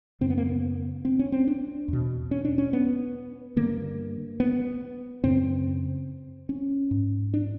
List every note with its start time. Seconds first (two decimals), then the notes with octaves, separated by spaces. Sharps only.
0.21 F#2 C#3 C4
0.30 B3
0.38 A#3
0.47 B3
1.05 C4
1.19 C#4
1.32 C4
1.47 D4
1.88 E2 B2
2.31 C#4
2.45 D4
2.58 C#4
2.73 B3
3.56 G2 D3 A#3
4.40 B3
5.24 F#2 C#3 C4
6.49 C#4
6.91 G#2
7.34 D4